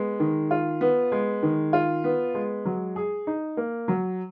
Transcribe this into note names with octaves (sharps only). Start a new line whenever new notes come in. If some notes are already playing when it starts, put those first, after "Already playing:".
Already playing: G#3 B3
D#3
F4
B3
G#3
D#3
F4
B3
G#3
F#3
G#4
D#4
A#3
F#3